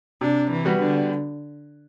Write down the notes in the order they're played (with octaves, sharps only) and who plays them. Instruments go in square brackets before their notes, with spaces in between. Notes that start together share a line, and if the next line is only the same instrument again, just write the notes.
[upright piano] C3 [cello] D4
[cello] E3
[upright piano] G3 B3 F#4
[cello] D3